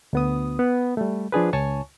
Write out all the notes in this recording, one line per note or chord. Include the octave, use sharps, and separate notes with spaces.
D2 B3 D#6
B3
G3 A3
F3 D4 G#4 B4
C#2 C#5 G#5 A5 C#6